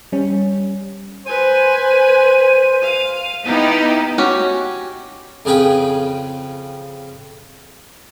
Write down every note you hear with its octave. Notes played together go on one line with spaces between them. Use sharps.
G3 C#4
B4 C5 G#5 D#7
F5
B3 D#4 E4 G4 F5
C#4 F#4 G4
F2 C#3 G#4 B4 G5